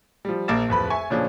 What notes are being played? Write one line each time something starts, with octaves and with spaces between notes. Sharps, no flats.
F3 G3
A#1 A#3 D6 A6 E7
D1 F2 B4 B5
E5 G#5 C#6
A#2 C#3 F3 C#4 D4